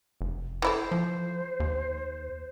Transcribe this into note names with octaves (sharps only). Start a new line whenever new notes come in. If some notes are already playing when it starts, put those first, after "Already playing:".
F1
E3 E4 A4 C5
F3
D#2